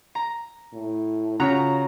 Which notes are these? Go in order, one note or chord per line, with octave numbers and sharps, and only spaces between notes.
A#5
A2
C#3 F4 F#4 C#5 A#5